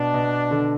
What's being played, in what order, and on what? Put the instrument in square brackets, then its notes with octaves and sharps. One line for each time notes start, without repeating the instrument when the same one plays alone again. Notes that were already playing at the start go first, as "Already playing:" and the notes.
Already playing: [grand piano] B2 [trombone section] D4
[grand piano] B2
D3